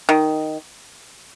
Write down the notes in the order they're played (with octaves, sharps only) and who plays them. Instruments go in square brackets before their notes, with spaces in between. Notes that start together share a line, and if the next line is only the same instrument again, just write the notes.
[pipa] D#3